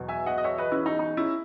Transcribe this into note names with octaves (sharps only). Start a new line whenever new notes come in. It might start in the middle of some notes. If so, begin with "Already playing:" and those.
Already playing: E2 B2 F#3
E5 G#5
D#5 F#5
D#5
C#5 E5
B4 D#5
C#4 E4
D#4
D#4
C#4 E4